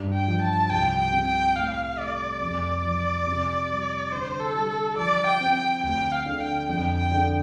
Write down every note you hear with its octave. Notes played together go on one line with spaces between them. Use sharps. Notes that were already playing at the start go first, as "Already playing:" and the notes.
Already playing: G2
G5
F3
A5
C2 G5
G5
C3
G5
A2 F5
A3 D5
F2
F3
C3
G3
D3 C5
A4
G3
A4
F3 D5
G5
C4
G5
D2 G5
F5
D3
G5
F2 G5
G5
D3